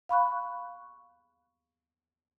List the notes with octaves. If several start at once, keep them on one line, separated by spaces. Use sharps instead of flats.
F5 B5 C#6 F#6